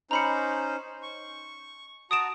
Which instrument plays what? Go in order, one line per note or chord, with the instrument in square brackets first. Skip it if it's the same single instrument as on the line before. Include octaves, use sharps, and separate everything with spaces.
[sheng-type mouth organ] C#4 D#4 C5 [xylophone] A#5 B5 C#7
[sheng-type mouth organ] C#6
[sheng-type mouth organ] F#4 A5 A#5 [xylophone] D#6 D7 E7